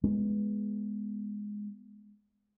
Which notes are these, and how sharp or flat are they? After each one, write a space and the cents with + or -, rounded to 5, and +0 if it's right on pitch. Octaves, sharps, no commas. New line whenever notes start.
G#3 +0 B3 +0